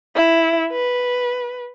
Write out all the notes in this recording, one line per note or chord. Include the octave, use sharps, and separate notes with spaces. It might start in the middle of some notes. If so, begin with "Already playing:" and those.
E4
B4